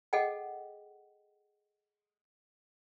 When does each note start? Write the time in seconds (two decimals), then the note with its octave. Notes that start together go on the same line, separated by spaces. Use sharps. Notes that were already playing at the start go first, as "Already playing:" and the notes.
0.13 G#4 A4 D#5 F#5 G5